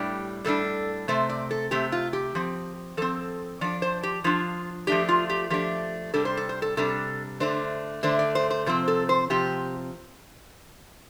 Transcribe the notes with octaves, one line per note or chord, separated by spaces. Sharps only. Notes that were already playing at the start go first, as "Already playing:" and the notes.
Already playing: A2 G3 D4 G4
A2 G3 D4 A4
C3 A3 C4 C5
D5
A4
C3 A3 C4 G4
F4
G4
F3 C4
F3 C4 A4
F3 D4 D5
C5
G4
F3 D4 F4
F3 A3 D4 G4
F4
G4
F3 A3 D4 G4
C3 G3 D4 A4
C5
A4
C5
A4
C3 G3 D4 A4
D3 A3 D4 C5
D3 A3 D4 C5
D5
C5
C5
C3 F3 C4 C5
A4
C5
C3 F3 C4 G4